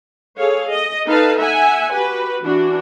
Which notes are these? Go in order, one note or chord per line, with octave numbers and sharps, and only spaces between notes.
G#4 A4 C#5 F5
D#5
D#4 A4 B4 F5 A5
E5 F#5 G#5
F#4 G4 B4
E3 D4 F#4